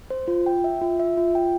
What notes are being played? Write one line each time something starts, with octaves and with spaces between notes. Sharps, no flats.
C5
F4
G5
E5
F4
E5
F4
G5